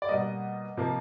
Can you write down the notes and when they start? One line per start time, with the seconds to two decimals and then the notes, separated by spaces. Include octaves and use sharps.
0.02 D5
0.09 B2 G3 A#3 D#5
0.77 C3 F3 A#3